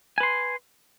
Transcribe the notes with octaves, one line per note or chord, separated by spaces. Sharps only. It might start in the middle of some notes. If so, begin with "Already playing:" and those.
B4 G#5 C6